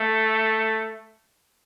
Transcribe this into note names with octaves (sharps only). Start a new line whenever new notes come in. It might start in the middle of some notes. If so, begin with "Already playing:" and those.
Already playing: A3